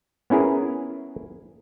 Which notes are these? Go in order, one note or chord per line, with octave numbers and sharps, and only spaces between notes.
B3 C#4 E4 G#4 A#4